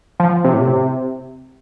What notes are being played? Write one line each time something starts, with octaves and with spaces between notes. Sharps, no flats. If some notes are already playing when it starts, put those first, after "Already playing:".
F3
C3
A2
C3